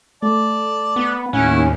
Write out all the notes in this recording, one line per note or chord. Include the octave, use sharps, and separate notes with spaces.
A3 D5 A5
B3
D#2 A2 C#4 E4 F#5 G#5